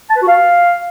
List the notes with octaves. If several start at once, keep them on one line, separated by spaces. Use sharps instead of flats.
A5
B4
F#4
F5